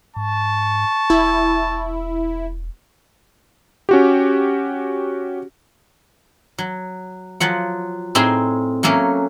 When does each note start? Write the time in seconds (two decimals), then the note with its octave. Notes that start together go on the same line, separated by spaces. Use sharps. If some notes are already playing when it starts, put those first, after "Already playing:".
0.16 G#2 A5 C#6
1.10 E1 E4
3.89 C#4 F#4 G4
6.58 F#3
7.40 F3 F#3 F#5
8.15 A2 C4 D#4 G#4 C6
8.83 F#3 A3 A#3 C#4